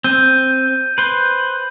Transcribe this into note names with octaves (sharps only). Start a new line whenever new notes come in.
C4 G6 D#7
B4 C5